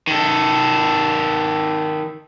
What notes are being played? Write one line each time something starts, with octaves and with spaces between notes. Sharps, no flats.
D#3 A4